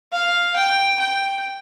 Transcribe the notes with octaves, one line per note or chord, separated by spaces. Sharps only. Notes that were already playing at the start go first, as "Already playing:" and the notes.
F5
G5
G5